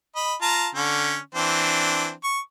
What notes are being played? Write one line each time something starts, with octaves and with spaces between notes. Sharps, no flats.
D#5 B5
F4 A5 A#5
D3 C#4
E3 C4 D4
C#6